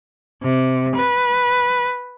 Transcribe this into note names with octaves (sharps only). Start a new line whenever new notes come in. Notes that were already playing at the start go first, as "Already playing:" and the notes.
C3
B4